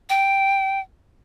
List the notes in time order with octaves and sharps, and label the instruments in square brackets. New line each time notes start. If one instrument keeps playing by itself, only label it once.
[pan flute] G5